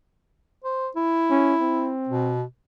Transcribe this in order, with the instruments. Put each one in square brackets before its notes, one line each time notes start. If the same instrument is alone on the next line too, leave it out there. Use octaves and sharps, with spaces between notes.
[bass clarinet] C5
E4
[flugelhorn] C#4
C4
[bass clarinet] B2